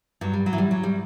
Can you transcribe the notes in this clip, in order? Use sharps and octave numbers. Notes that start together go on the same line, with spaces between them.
G2 F#3
G3
F#3
E3
G3
F#3
G3